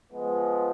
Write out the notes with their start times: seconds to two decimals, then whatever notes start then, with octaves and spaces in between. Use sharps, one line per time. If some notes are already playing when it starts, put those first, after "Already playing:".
0.11 F3 G#3 B3